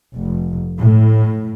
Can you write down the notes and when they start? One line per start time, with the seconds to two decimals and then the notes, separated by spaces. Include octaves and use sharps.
0.15 F1
0.79 A2